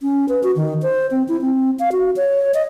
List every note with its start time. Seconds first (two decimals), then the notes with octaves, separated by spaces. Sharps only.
0.03 C#4
0.29 B4
0.43 F#4
0.56 D#3
0.82 C5
1.11 C4
1.28 E4
1.41 C4
1.79 F5
1.92 F#4
2.17 C#5
2.54 D#5